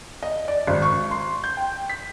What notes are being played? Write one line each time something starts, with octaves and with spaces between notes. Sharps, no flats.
D#5
D5
G#1
C#6
C6
G6
G5
B6